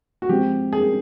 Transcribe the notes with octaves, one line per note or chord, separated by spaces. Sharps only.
F#4
F3 G#3 C4 G4
G#4